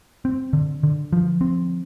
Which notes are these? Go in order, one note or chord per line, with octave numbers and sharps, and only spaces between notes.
C4
D3
D3
F3
C4